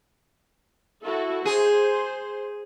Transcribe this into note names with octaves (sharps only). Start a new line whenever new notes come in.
E4 F#4 A4
G#4 C5